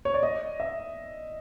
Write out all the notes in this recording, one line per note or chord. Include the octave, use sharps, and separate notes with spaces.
C#5
D5
D#5
E5